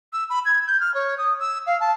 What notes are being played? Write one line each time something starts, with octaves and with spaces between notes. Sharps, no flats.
E6
B5
G#6
G6
F6
C#5
D#6
E6
F5
A5